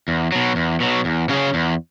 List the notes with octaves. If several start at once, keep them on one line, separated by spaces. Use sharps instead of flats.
E2
B2 F#3
E2
B2 F#3
E2
C#3 F#3 C#4 G#4
E2